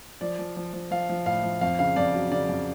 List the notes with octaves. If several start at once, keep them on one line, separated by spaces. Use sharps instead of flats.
F3 D5
F3
F3
F3
F3 F5
F3
A2 F5
F3
F2 F5
C#3 F5
F2 D5
F#3
C#3 D5
F2